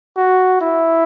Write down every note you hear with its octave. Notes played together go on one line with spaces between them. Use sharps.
F#4
E4